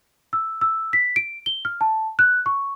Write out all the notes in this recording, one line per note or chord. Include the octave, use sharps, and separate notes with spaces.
E6
E6
B6
D7
G7
F6
A5
F#6
C#6